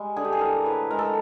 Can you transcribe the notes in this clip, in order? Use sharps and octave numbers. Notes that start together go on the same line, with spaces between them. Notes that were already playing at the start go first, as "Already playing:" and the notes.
Already playing: G3 G#3
D3 G#4
G4
G#4
E3 A#4
A2 B4
G#3 A#4
A4